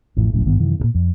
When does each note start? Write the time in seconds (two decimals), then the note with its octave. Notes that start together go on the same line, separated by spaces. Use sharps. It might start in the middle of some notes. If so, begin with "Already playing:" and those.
0.17 A1 F2 A2
0.34 F1 A#1 F#2 A2
0.46 G#1 G2 D#3 B3
0.59 F#2 C3 D#3 E3
0.80 D2 A#2
0.95 F2